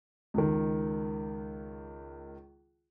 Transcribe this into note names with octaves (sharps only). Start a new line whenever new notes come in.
C#2 D#3